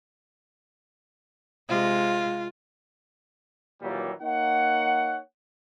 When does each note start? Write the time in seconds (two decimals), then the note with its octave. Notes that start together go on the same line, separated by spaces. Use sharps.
1.69 C3 G#3 F4
3.82 D#2 A#2 E3 F#3 G3
4.22 A#3 D#4 C#5 F#5